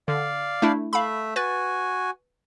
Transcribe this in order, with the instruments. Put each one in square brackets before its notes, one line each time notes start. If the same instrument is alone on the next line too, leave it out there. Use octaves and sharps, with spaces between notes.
[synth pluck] D3 [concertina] D5 F5
[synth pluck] A3 D4 E4
[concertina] A3 E5 [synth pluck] F5 B5
[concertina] F#4 G#5 [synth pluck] B4 A6